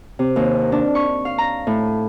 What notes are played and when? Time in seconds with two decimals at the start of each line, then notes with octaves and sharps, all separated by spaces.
0.19 C3
0.36 D#2
0.72 D4
0.95 C#6
1.25 F5
1.38 A#5
1.67 A2